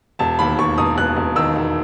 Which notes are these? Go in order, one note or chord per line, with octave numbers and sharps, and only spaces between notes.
E1 A5
D#2 B5
D#2 C#6
E1 D#6
E1 F#6
E1
D#3 E6
E1